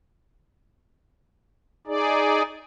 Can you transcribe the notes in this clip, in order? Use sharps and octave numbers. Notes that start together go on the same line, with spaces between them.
D#4 G#4 D5